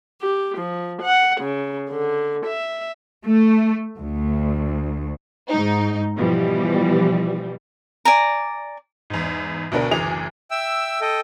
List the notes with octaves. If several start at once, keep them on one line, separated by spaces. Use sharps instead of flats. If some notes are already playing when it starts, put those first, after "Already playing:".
G4
F3
F#5
C#3
D3
E5
A3
D2
G#2 D#4
B2 E3 F3 G3
D5 G#5 A#5
E2 G#2
D2 B2 B3 D4 A#4 B4
F#1 D2 E3 G#4 D6 F7
E5 G5 E6
A4 D#5 G5